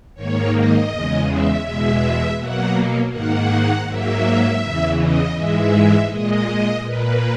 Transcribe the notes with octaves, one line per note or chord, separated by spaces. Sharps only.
G#2 D#3 A#3 C#5
D#5
E2 C#3 G#3
E5
E2 B2 G#3 E5
B2 F#3 A#3 F#5
G#2 D#3 A#3 F#5
G#2 F#3 A#3 E5
E2 C#3 E3
D#5
G#2 E3 G#3 E5
A#2 G#3 D#5
A#2 A#3 B4